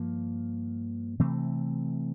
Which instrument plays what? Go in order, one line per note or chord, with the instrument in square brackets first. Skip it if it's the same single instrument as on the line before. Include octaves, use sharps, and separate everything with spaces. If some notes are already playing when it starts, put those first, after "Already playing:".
Already playing: [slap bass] G2 F3 A#3
C3 E3 A3 C4